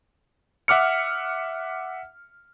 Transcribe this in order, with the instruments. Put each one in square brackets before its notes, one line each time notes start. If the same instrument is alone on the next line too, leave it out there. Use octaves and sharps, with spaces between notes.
[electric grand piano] E5 F#5 D6 F6 C#7